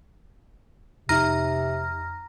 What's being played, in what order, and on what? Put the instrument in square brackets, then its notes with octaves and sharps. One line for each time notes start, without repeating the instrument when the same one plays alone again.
[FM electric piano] F2 D#4 [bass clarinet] C3 [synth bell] A#5 F6 A#6